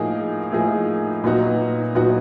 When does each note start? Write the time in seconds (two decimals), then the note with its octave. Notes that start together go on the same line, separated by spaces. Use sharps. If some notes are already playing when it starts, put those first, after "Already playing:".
Already playing: A2 F3 A#3 D#4 G#4
0.52 A2 F3 A#3 D#4 G#4
1.24 A#2 F#3 B3 D#4 F#4
1.95 A#2 F#3 B3 D#4 F#4